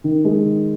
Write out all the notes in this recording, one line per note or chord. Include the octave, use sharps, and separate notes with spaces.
D#3
G#3
D#3